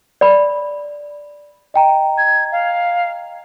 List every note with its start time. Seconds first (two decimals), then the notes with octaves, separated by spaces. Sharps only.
0.21 D5 B5
1.74 D#5 G5 A#5
2.18 G#6
2.52 F5